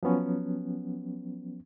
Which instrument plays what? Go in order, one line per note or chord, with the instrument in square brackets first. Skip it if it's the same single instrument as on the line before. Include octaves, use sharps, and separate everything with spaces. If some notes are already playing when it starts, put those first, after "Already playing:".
[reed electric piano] F3 F#3 B3 C#4